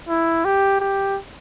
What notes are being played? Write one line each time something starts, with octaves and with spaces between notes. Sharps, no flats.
E4
G4
G4